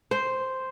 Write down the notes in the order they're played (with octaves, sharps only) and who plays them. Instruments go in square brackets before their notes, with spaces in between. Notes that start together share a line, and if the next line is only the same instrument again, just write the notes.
[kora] C5